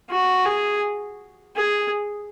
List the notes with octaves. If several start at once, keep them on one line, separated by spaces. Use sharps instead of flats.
F#4
G#4
G#4